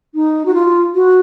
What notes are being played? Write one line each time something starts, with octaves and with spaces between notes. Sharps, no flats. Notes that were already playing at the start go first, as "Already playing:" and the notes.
D#4
F#4
F4
F#4